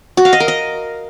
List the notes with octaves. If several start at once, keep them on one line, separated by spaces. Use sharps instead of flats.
F#4
F5
D#5
A#4
D#5